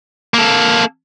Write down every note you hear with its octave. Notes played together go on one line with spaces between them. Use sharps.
A#3 A4